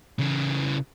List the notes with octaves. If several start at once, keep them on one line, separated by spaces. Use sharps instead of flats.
C#3 E3